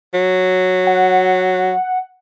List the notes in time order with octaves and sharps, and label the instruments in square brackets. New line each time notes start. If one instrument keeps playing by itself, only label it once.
[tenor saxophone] F#3
[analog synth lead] F#5